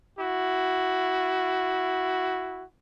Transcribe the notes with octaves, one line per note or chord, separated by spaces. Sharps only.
E4 F#4